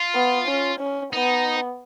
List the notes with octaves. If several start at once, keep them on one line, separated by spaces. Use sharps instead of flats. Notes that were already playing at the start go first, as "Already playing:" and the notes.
Already playing: F4
B3
C#4
C#4
B3 D#4